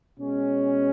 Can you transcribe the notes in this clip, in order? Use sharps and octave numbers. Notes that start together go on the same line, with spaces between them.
B2 G#3 C#4